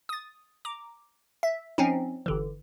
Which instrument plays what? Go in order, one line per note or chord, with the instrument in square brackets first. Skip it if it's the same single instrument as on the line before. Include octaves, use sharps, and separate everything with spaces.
[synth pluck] D#6 A6
A#5 D6
E5
F3 C4 C#4 D#4
G1 D3 E3